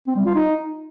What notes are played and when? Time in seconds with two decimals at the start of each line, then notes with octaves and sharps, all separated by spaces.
0.07 C4
0.16 G3
0.26 F4
0.35 D#4